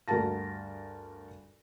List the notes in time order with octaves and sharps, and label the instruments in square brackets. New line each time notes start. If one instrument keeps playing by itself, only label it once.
[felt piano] D2 G2 F#4 A#4 A5 A#6